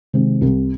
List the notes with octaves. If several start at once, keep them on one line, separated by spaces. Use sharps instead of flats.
C3 D#3 G#3 C4
C2